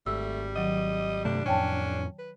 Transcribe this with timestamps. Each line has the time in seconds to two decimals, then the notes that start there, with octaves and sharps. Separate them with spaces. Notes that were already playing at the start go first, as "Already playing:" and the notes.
0.06 G#1 G3 A3 E6
0.56 D#3 F#3 D#5
1.25 G2 C3 A3 D4
1.46 F2 A2 C#4 C#5 G5 A5
2.19 B4